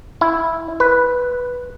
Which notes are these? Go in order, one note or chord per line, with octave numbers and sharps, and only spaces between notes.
E4
B4